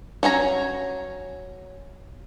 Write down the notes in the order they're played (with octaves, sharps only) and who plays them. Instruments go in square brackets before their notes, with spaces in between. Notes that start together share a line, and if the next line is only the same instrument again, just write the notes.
[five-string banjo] F#3 C#4 C#5 A#5